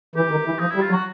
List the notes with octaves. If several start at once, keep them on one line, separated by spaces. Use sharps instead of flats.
E3 G4
D#3
E3
F3 D#4
G3 E4
F4
F#3
F#4